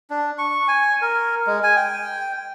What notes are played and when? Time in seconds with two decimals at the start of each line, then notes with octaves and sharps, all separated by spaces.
0.10 D4
0.38 C#6
0.68 G#5
1.02 A#4
1.47 G#3
1.63 G#5
1.76 G5